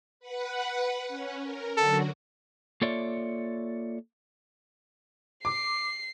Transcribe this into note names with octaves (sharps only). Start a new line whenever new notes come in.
B4 F#5
C#4
A#4
D3 F#3 F#4 A4
A#3 F4 A4 C#5 D5 E5
D6 C7